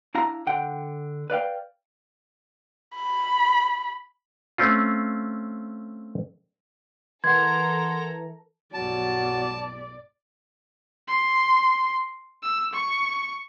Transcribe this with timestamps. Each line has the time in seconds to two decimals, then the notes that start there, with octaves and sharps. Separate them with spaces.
0.15 D4 E4 F5 A#5
0.47 D3 F#5 G5
1.30 B4 D5 F5 G5
2.95 B5
4.58 A3 C4 C#4 F4
7.24 E3 A4 A#4 F#5 A#5 C6 G#6
8.74 B1 G2 F#3 D5 A5
11.08 C6
12.42 E6
12.73 C#6